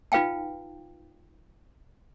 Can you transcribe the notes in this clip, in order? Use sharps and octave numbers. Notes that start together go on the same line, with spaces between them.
D#4 F4 B4 F5 G5 A5